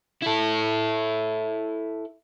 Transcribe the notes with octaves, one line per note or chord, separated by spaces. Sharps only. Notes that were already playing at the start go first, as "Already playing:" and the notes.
E4 A4